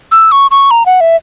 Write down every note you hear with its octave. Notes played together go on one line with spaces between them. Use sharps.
E6
C#6
C#6
A#5
F#5
E5